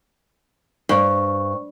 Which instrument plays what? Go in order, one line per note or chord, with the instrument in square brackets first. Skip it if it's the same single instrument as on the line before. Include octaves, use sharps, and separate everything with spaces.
[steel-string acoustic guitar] G2 [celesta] C5 C#6